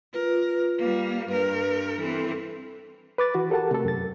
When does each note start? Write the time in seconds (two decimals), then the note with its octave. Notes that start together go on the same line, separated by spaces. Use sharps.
0.14 F4 A#4 B4
0.78 G3 A#3
1.29 G2 A#4 B4
1.99 E3 C4 A4
3.18 B4 D6 A6
3.35 E3 F#4
3.50 G4 A4 A#4 F#5 A5
3.71 C3 A3 A4
3.85 F#2 A6